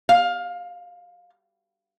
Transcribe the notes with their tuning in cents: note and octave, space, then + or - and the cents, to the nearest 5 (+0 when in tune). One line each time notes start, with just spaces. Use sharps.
F5 +20